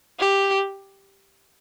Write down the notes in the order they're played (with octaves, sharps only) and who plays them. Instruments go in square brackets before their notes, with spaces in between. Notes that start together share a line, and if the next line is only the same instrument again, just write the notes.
[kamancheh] G4